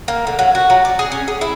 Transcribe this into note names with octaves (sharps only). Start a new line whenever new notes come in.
A#3
D3
F#3
F#4
F#3
D5
G#4
C#4
G#4
E4